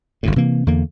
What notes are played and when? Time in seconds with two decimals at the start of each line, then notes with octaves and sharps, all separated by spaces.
0.23 G1 D2 A2
0.36 C3 E3 A#3
0.66 E2 D3 A#3